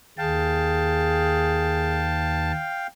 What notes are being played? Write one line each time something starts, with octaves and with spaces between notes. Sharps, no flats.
D#2 G#4 F5 G5 A5